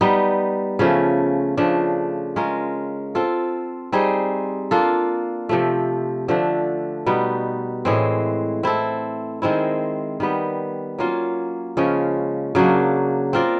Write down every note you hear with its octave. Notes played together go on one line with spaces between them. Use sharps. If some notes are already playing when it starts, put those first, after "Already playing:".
G3 B3 D#4
C#3 F3 A3 C#4
C#3 F3 A3 D4
G#3 C#4 F4 A#4
C4 F4 A4
G3 C4 D#4 G#4
A#3 D4 F4 A4
C3 F3 A3
D3 F3 A3 D4
B2 G3 B3 D#4
A2 E3 G#3 C4
C4 E4 A4
D#3 G#3 C4 E4
D#3 G3 B3
F#3 A#3 C#4 F4
C#3 F3 G#3 C#4
C#3 F#3 A#3 D4
C4 F4 A#4 D5